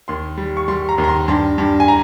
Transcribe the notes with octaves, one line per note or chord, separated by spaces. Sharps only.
D#2 C6
G3
C#6
G3 C6
A#5
D#2
A#5
C6
G2 C6
G2
G#5
A#5